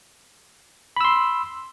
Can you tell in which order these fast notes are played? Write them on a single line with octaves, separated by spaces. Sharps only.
B5 E6 C6